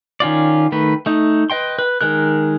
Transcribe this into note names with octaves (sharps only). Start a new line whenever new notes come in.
D#3 C#4 F4 D5
D#3 A3 B4
A3 D#4
B4 D#5 G5 C6
B4
D#3 G#3 A#4 F#6